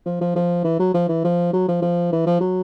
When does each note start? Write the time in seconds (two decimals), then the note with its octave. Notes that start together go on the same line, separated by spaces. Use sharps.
0.06 F3
0.21 F3
0.35 F3
0.64 E3
0.79 F#3
0.94 F3
1.09 E3
1.24 F3
1.53 F#3
1.68 F3
1.82 F3
2.12 E3
2.27 F3
2.41 F#3